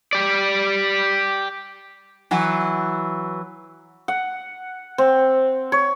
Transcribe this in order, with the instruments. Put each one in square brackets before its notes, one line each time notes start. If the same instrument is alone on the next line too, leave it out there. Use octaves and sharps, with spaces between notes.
[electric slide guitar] G4 D5
[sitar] E3 F#3
[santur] F#5
C4
C#5